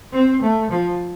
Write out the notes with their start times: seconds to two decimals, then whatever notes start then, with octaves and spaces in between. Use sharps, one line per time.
0.13 C4
0.42 A3
0.71 F3